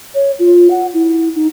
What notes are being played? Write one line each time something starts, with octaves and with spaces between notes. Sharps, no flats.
C#5
F4
F#5
E4
D#4